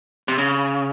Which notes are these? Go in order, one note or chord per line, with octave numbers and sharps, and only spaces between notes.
C3
C#3